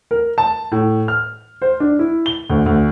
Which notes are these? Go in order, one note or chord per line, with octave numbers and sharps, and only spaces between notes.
A#4
A5
A2
F6
C5
D4
E4
G7
D2
D2